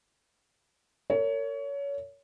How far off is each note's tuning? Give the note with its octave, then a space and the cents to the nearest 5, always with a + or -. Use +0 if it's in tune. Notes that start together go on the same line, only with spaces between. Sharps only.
A#4 -35 C#5 +25